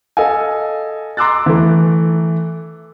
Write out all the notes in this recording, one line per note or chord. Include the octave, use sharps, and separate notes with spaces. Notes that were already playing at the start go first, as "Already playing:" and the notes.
A4 D#5 F5 G#5
A#5 C6 D6 E6 F#6 A6
E3 A3